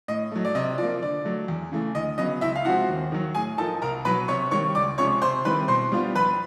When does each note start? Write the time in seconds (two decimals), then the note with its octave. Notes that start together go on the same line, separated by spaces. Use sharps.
0.08 A2 D#5
0.32 F#3 A3
0.45 D5
0.55 C3 D#5
0.78 F3 A#3 D5
1.02 D3 D5
1.25 F#3 A3
1.48 E2
1.72 C#3 E3 A3
1.95 D2 D#5
2.18 C#3 F#3 B3 D#5
2.41 C#2 E4 E5
2.56 F5
2.65 C3 F3 G#3 C4 F#4 F#5
2.89 D#2
3.12 D#3 F#3
3.35 A2 G#4 G#5
3.58 F3 A#3 D#4 A4 A5
3.82 C2 A#4 A#5
4.05 B2 F#3 B4 B5
4.28 C3 C#5 C#6
4.51 D#3 G3 A#3 C#5 C#6
4.75 C#2 D5 D6
4.98 C3 F3 G#3 C#4 C#5 C#6
5.22 C3 C5 C6
5.45 D#3 G3 C4 E4 B4 B5
5.68 B2 C5 C6
5.92 G3 B3 D4 F4
6.15 F2 B4 B5